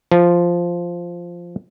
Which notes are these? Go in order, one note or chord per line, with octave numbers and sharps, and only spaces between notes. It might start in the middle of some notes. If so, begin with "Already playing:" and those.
F3